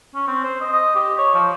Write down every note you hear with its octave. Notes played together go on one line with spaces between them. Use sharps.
C#4
C4
C5
D#5
D#5
G4
C#5
F3